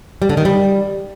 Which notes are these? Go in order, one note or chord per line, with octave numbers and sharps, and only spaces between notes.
G3
D3
D#3
G3